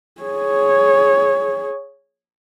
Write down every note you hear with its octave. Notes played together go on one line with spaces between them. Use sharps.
G#4 C#5